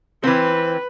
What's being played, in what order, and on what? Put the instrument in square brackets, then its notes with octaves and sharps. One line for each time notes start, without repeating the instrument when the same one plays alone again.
[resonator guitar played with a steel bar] E3 C4 [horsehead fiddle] B4